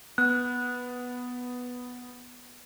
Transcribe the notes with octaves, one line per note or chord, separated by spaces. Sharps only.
B3 F#6